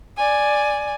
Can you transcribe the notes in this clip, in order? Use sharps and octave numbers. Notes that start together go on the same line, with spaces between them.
D5 G#5